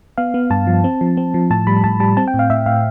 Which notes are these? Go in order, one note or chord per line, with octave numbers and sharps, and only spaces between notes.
B3 F5
B3
G2 A5
F3
C4
F3
C4
F3
A2 A5
G3 B5
A2 A5
G3 A5
C4 A5
G5
A2
F5
A2 E5
A2 F5